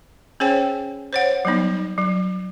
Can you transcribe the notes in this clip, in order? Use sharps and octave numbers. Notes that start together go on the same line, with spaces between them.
C#4 G#4 C5 C#5 G5 G#5
C5 C#5 F#5
F#3 G3 B3 D#4
F#3